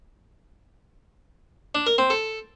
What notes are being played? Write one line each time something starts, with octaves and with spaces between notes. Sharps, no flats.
D4
A#4
C4
A4